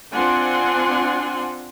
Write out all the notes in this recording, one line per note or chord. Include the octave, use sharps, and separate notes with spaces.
C4 D4 F4 F#5 G#5 C6